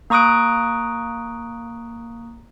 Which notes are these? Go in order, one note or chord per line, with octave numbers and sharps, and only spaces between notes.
A#3 A#5 C#6 D#6 F#6 D7